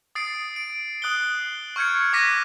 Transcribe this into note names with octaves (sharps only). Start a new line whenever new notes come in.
D#6 A6 C7 D7
D7
D#6 F#6 C7 G7
C#6 F6 G6 G#6 C#7
D6 F#6 G#6 A#6 B6 D#7